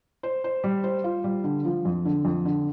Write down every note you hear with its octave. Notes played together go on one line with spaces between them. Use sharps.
C5
C5
G3
C5
F4
G3
D3
F3
F2
D3
F2
D3